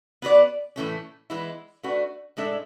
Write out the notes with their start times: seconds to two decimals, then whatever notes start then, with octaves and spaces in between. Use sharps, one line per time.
0.22 B3 F#4 B4 D5
0.76 A2 E3 A3 C#4
1.30 E3 G#3 B3 E4
1.83 A3 D4 F#4 B4
2.37 A2 G#3 D4 A4 E5